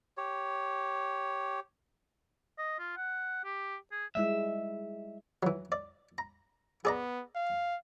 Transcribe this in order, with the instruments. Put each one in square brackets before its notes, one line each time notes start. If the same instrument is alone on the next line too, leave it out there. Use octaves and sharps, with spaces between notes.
[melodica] G4 C#5
[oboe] D#5
F4
F#5
G4
G#4
[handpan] G3 G#3 E4 [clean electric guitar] E5
[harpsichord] E3 F#3
D5
A#5
[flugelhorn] B3 [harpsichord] G#4 D5 A#5
[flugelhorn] F5